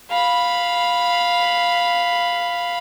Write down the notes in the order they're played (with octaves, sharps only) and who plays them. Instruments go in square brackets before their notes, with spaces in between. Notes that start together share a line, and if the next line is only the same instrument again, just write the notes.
[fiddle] F5 B5